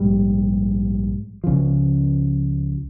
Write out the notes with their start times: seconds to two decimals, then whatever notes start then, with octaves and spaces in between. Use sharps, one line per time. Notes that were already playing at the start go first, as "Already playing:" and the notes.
Already playing: A#1 G#2 G3
1.44 C#2 C#3 F3